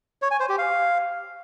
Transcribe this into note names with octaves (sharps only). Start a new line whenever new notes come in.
C#5
G#5
C5
G4
F5